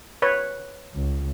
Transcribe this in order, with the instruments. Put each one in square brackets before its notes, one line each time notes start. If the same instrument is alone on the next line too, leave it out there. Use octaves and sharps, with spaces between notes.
[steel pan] B4 C#5
[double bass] C#2